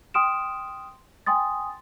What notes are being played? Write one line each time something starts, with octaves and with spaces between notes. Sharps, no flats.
G5 C6 D#6 F6 D7 E7
G5 G#5 C6 D#6 A6